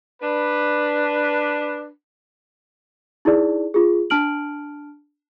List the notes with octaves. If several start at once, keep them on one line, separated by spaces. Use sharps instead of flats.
D4 B4
D#4 E4 G#4 D5
F4 G#4
D4 A5 F6 D7 F#7